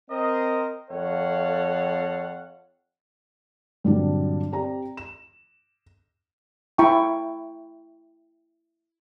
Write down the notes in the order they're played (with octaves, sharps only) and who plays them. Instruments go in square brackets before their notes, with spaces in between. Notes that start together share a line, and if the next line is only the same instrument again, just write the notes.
[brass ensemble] C4 A#4 C5 D#5
F2 A4 C#5 F5 F#5
[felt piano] G2 A#2 D3 F#3 C4 D4
C4 G4 D5 A#5
E7
[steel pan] E4 E5 G5 A#5 B5 C#6